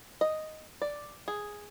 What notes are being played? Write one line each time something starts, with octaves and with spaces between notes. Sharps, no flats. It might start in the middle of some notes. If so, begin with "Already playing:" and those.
D#5
D5
G#4